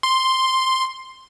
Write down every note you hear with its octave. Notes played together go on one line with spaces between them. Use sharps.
C6